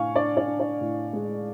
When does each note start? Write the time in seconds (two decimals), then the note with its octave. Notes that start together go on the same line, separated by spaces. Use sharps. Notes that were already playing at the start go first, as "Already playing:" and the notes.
Already playing: A2 D4 F5 G#5 C#6
0.16 D4 D5
0.37 D5
0.48 D4
0.60 D5
0.81 A2
1.13 G#3